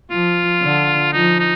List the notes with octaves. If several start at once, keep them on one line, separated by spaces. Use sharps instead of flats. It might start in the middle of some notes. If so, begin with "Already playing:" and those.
F3 F4
D3
F3 D#4
D#4